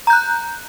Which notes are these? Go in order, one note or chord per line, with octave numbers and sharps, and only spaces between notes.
A#5 F#6 G6